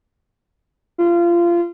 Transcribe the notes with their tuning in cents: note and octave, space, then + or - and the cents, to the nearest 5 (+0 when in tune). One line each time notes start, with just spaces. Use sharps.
F4 -25